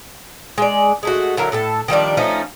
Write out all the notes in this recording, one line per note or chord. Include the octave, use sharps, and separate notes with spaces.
G#3 D5
G#3 A3 F#4
D3 F#3 E4 A#4
A2 A4 A5
D#3 F3 G3 D4
F3 A3 C#4 D#4